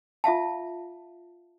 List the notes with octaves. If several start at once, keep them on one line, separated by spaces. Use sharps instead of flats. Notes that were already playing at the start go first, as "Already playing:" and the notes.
F4 E5 F5 A5